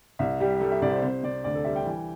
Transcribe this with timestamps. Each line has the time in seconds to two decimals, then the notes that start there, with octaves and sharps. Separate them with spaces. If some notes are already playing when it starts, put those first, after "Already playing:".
0.19 C2 E5
0.40 G3 G4
0.61 G3 A4
0.72 E5
0.82 C2 D5
0.92 C5
1.02 C3 C5
1.23 C3 D5
1.44 D2 D5
1.55 A4
1.64 G3 E5
1.76 G5
1.85 E3